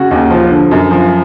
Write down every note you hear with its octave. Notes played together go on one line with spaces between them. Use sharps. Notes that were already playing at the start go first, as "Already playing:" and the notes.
Already playing: C#3 F#4
D#2
F3
D3
F#2
F3